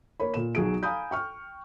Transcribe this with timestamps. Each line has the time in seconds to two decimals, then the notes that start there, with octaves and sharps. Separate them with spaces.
0.20 A#3 A#4 C#5 B5
0.34 A#2 E7
0.55 B1 F#3 G#4 D7
0.83 F5 G#5 A#5 B5 D#6 G6
1.11 G5 C#6 F6